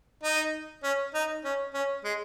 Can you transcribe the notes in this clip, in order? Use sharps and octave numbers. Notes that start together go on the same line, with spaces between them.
D#4
C#4
D#4
C#4
C#4
G#3